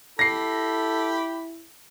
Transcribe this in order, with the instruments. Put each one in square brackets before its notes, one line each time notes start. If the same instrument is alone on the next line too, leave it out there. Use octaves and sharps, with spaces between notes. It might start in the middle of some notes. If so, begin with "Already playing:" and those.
[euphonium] E4 [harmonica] G4 B5 [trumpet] A4 [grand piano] A#6 C7